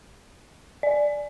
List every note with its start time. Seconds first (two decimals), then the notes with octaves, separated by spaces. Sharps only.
0.83 D5